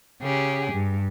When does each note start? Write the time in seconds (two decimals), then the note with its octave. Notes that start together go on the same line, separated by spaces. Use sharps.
0.21 C#3 G4 G#4
0.72 G2